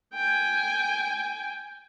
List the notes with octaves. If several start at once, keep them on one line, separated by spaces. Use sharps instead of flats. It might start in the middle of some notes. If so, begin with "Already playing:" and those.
G5 G#5